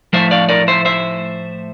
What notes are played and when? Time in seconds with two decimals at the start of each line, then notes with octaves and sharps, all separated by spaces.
0.13 A2 F3 A3 C5 E5
0.31 D5 F5
0.49 A#4 D5
0.68 C5 E5
0.85 C5 E5